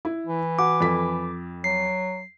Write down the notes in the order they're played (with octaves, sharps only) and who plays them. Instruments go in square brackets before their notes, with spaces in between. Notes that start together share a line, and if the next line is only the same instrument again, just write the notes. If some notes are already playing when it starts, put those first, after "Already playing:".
[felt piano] E4
[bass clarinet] E3
[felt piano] F#4 F#5 [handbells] D6
[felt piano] F2 A4 B6
[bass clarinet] F#3 [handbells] C7